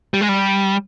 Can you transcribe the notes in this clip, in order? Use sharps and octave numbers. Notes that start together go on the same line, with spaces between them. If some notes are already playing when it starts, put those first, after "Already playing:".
G3
G#3
G3